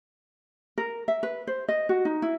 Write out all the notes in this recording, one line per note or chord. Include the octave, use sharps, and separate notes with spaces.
A#4
E5
B4
C5
D#5
F#4
D#4
E4